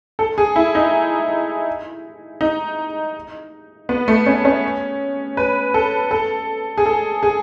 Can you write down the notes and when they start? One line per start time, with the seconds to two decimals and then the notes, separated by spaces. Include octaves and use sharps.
0.19 A4
0.38 G#4
0.56 E4
0.75 D#4
2.41 D#4
3.89 B3
4.08 A3
4.26 C#4
4.45 C#4
5.37 B4
5.74 A4
6.11 A4
6.78 G#4
6.86 A4
7.23 G#4